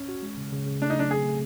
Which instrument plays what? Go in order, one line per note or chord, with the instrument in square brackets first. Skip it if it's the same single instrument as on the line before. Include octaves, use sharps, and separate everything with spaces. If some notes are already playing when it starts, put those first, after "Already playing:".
Already playing: [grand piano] C#4
[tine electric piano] F#4
G#3
C#3
C#3
C#3
[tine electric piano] A3 [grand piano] D4
[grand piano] D#4
[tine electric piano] F#3 [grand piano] D4
[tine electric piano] C4 [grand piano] G#4
[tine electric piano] A3